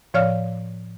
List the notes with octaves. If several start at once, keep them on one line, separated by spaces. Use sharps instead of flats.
A2 F3 C#5 D5 F5 F6